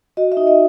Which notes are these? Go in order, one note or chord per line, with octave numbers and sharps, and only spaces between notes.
F#4 D#5
E5
D#4
D#5